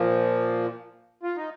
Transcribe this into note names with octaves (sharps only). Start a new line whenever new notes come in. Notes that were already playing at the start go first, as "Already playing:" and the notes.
Already playing: A#2 F3
F4
D#4